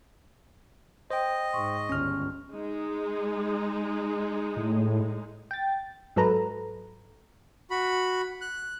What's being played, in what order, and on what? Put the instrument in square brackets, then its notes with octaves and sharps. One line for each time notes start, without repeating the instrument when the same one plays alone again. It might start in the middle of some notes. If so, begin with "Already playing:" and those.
[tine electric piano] C5 G5 [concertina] D#5
[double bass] G#2 [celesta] C6 C#6
[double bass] G1 C#2 [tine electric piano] C#4 F6
[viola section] G#3 D#4
[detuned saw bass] A2
[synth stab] G5 A6
G#2 F#3 A4 B4 A#5
[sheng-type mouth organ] F#4 B5
F#6